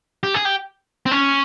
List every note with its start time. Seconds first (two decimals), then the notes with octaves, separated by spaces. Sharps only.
0.23 G4
0.34 G#4
0.45 G4
1.06 C4
1.11 C#4